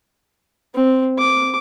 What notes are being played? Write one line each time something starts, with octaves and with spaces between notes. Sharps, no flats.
C4
D6